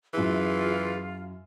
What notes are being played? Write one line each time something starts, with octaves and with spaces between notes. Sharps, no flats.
F#2 E3 E4 F4 G#4